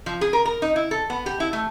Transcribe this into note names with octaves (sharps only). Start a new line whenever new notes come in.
F3
G#4
A#4
A#4
D#4
E4
A4
B3
G4
E4
A3